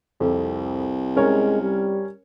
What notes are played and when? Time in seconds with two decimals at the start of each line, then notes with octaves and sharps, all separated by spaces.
0.20 C2 F2
1.16 G#3 C#4 A#4 C#5
1.62 G3